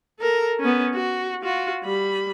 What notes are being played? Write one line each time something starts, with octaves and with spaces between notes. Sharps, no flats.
A4 A#4
B3 C#4
F#4
F4 F#4
G3 B5